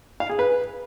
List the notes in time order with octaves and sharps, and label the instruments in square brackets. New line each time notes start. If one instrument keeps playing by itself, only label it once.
[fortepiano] F5
G#4
B4